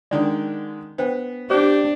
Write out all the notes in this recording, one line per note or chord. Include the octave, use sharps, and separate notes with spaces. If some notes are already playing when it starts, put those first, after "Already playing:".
D3 D#3 G#3 C#4 D5
B3 D4 C5 G5
D4 G4 C5 D5 D6